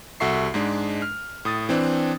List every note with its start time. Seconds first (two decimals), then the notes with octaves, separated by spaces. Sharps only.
0.20 C2 F#4 A4 E5 C#6 C7
0.54 G#2 G#3 D4
1.02 F6
1.45 A2 D#6 A6
1.69 E3 C4 D4